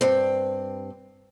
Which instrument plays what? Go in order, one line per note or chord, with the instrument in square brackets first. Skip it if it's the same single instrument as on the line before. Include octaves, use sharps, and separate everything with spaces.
[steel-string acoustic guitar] G2 C4